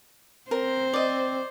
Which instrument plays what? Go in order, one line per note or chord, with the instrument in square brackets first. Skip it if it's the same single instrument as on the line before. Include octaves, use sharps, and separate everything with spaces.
[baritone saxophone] C4 [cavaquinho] A#4 [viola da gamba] C5
[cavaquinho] D5 D#5